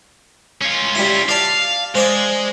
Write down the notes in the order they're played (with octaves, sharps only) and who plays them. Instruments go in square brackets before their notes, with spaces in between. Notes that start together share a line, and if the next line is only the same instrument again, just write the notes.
[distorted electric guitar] C#4 F4
[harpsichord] G3 E4
[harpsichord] D5 A5 [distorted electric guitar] F5
[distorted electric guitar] G#3 [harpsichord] C5 D5